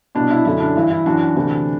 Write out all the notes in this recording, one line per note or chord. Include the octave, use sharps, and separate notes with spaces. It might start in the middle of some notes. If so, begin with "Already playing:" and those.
C2 B2 D4
E4
F#2 D3 E4
D4
G2 E3 E4
E4
F#2 E3 D4 F#4
D2 C3 E3